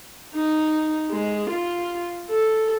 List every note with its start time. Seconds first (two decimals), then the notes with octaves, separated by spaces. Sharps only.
0.34 D#4
1.10 G#3
1.50 F4
2.30 A4